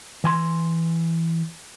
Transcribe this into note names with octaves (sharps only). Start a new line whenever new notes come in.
E3 G#5 C6